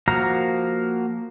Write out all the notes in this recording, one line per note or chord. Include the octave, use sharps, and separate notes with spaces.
F3 A#3 F#4 F5 A#5